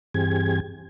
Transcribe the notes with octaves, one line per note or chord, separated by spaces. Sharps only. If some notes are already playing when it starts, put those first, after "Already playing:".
G2 E3 C4 G4 G#4 G#6